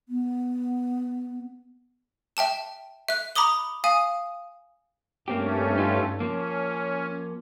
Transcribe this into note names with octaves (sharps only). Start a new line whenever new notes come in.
B3
E5 G5 A5 E7
E5 F#6
A#5 B5 D6 D#6 G7
F5 G#5 D#6
G2 A3 A#3 C4 C#4 G4
D#4 F4 G4
F3 A#3 C#4